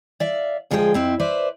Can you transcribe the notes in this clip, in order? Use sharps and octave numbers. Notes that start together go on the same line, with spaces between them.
D5 E5 F5
D2 F3 G#3 G#4 C5 G5
F2 C4 E4
B4 C5 D5 E5